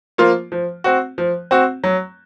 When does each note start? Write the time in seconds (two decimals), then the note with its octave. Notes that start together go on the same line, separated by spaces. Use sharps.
0.18 F3 A#3 F4
0.52 F3
0.84 C4 F#4
1.18 F3
1.51 C4 F#4
1.84 F#3